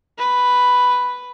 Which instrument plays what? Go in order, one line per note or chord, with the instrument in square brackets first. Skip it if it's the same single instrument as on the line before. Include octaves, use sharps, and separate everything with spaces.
[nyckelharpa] B4